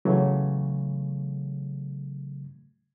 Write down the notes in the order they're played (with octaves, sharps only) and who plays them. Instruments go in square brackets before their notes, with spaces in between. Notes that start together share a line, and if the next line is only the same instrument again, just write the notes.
[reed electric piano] C#3 E3 F#3 A3